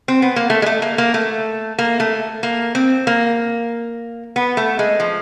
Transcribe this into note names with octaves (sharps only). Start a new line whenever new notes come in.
C4
B3
A#3
A3
G#3
A3
A#3
A#3
A3
A#3
A3
A#3
C4
A#3
B3
A3
G#3
F3